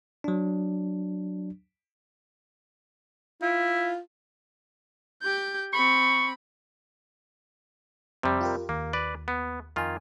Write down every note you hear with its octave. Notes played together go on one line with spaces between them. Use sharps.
F#3 D4
E4 F4
G4 G6
C4 B5 C#6
F2 C3 G3 C4
F4 G4 A#4
D#2 A#3
B4 D5
B3
F2 D#3 F4 G#5